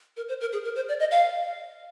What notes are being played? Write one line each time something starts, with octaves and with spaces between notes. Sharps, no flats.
A#4
C5
A#4
G#4
A#4
C5
D5
D#5
F5